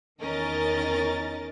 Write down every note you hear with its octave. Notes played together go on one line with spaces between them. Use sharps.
E2 D#3 C#4 A#4 D#5 A6